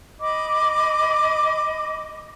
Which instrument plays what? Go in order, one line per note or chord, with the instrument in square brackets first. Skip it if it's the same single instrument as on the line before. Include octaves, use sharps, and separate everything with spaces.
[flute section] D#5 B5 D6